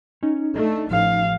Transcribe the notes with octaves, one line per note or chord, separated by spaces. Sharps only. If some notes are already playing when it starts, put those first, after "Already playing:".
C#4 D#4
A3 D4 D#5
A1 F3 F5